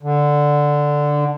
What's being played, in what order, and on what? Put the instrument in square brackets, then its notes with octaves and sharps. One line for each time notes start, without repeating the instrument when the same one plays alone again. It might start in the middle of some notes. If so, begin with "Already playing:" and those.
[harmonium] D3